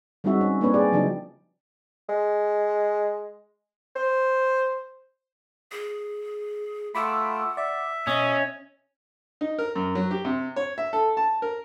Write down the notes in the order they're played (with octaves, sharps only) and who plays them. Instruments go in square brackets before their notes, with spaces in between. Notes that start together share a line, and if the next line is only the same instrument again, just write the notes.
[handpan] G3 G#3 C4 D#4 F#4 E5
C#4
A#3 C4 D4 B4 C#5
G4 G#4 D5
C#3 F3 F#3 D4 D#4 G4
[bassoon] G#3
C5
[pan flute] G#4
[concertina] A3 F4 [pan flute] F#5 [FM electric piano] B5 D6 E6
[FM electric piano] D5 [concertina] E5
[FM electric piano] B2 D#6 [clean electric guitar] C#4 [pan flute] D#5
[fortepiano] D#4
A#4
F#2
F#3
G4
C3
C#5
E5
A4
A5
A#4